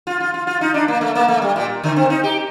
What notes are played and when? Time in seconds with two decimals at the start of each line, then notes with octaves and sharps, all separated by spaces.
0.07 F4
0.20 F4
0.34 F4
0.47 F4
0.61 D#4
0.74 D4
0.88 A#3
1.01 A3
1.15 A#3
1.28 A3
1.42 G3
1.56 A#2
1.84 D3
1.96 C4
2.10 D#4
2.24 G4